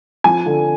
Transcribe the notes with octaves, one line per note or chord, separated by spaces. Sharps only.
F3 G#5
D3